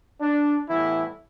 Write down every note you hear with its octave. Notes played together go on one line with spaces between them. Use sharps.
D4
A2 E3 G3 B3 E4